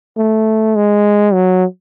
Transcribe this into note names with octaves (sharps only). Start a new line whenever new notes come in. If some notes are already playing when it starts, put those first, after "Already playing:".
A3
G#3
F#3